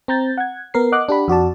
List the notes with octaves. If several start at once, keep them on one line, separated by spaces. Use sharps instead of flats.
C4 A#5 G6 A6
F#5 G#6
B3 A#4 C7
D#5 F#5 D6 F#6
D4 G4 F#5 B5
F2 F#4 D5 A5